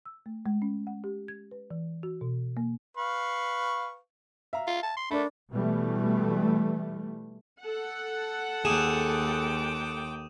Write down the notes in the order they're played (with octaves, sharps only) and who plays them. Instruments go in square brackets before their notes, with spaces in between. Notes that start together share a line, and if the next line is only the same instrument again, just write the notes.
[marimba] E6
A3
G#3
C#4
F#5
G4
G#6
B4
E3
F#4
B2
A#3
[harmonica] B4 F5 C#6
[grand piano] E5 F5 A#5
[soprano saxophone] F4
A5
C6
[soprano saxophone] A3 [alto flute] D4 [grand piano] A#4 B5
[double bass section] B2 E3 G3 A3
[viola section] A4 F#5
[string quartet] D#2 G5 D6 [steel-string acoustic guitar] G#4 [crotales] D#6 D#7 E7